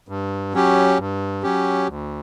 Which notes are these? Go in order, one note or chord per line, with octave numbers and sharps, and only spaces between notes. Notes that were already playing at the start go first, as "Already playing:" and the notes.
G2
F#3 C#4 G4
G2
F#3 C#4 G4
D2